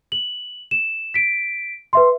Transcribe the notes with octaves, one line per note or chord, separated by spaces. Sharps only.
F#7
E7
B6 D7
B4 E5 C6